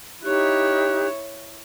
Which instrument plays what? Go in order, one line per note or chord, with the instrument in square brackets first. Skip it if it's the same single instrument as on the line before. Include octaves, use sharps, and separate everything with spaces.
[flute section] D#4 G4 F#6 [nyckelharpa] E4 C#5